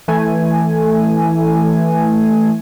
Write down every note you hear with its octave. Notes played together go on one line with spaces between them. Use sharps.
E3 A3 G#5